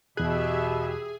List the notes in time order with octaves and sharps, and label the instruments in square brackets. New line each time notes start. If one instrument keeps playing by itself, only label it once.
[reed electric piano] E2 F#6 [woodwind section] B2 [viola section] G4 E5 [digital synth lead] G#4